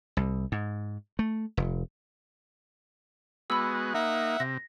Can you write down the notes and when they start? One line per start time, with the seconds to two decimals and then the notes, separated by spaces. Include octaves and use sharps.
0.17 C2
0.52 G#2
1.19 A3
1.57 F1
3.50 G#3 B3 F#4 B5 E6
3.94 A#3 D#4 E5 F#5
4.40 C3 A#6